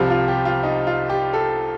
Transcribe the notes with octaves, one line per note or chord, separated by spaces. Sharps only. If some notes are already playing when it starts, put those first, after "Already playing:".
Already playing: C2 C3 F3 F4
F4
G4
F4
D#4
F4
G4
A4